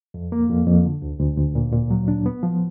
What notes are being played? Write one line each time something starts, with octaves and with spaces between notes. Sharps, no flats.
F2
A#3
F2
F2
D3
D2
D2
D2
A#2
A#2
F#3
D4
B3
F3